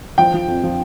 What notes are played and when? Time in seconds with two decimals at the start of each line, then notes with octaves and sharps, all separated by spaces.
0.18 F3 G5
0.34 F3
0.48 F2
0.63 F3